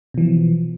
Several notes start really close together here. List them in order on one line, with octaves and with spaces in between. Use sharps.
B2 E3 F3